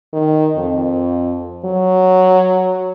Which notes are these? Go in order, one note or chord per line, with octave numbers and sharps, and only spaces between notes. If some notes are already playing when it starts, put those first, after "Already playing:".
D#3
F2
F#3